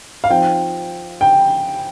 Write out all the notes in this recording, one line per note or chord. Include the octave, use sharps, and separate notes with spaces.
F5
F3 C4 D#4 G5
G5